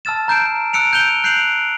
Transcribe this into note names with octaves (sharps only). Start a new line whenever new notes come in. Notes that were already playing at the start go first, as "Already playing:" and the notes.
A5 E6 F6 A6 E7
A#5 G6 C7 D7
E6 F#6 C#7 D7 F7
G6 D#7 F7 G7
F#6 G6 C7 D7 F7 F#7